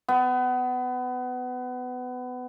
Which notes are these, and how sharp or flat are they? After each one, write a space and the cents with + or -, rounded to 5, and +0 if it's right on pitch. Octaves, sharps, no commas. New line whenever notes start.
B3 +25